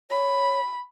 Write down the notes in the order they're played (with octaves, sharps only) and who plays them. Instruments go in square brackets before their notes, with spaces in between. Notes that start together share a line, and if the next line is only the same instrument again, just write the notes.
[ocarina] C#5 [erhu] B5